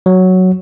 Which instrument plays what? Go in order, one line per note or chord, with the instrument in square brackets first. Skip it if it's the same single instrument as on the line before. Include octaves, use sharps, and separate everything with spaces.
[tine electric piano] F#3